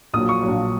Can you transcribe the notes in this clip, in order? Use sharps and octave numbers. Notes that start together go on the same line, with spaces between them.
A#1 A#2 F#3 D#6
C#6
A#1 A#2 F#3